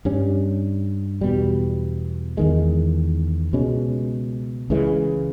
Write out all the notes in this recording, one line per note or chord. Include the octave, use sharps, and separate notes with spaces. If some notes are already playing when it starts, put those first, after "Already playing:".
G2 G3 C#4
E2 B2 G3
E2 D#3 G#3
C#2 B2 G#3 C#4
C#2 C#3 E3 G#3